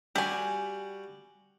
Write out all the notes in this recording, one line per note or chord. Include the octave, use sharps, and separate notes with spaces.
G3 F#4 G4 G#5